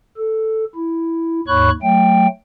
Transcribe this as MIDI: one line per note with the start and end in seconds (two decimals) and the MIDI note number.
0.17 0.64 69
0.75 1.40 64
1.48 1.70 39
1.48 1.70 44
1.48 1.70 73
1.48 1.70 83
1.48 1.70 85
1.48 1.70 90
1.82 2.27 54
1.82 2.27 57
1.82 2.27 79